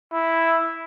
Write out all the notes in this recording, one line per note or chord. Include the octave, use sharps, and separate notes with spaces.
E4